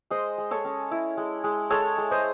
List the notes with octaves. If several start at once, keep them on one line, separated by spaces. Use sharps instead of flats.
G#3 C5 D#5
G#3
A4 C#5
C#4
E4
G#3
G#3
G#3 A4 C#5
G#3
C5 D#5